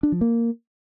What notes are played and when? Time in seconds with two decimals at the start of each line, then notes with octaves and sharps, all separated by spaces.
0.03 D4
0.12 F3
0.21 A#3